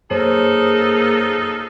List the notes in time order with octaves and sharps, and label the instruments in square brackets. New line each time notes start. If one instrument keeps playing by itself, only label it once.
[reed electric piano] F#2 C5 C#5 [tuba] A#3 [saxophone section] D#4 F4 A4 [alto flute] G#4